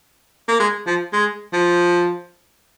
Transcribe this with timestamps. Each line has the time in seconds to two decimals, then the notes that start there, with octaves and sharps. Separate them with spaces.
0.48 A#3
0.60 G#3
0.87 F3
1.13 G#3
1.53 F3